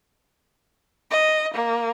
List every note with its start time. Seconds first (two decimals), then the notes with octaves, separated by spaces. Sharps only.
1.11 D#5
1.54 A#3